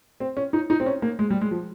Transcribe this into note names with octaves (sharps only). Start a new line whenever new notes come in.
C4
C#4
D#4
D#4
C4
C#4
A#3
G#3
G3
G#3
F3